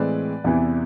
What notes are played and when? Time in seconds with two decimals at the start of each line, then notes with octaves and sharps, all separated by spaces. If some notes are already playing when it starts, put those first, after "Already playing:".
Already playing: A2 E3 G#3 C4 B4 D5
0.44 E2 C3 E3 B3 E4